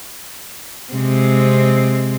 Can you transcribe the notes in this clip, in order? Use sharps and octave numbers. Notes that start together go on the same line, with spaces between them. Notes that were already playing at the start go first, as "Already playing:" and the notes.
C3 G#3 C4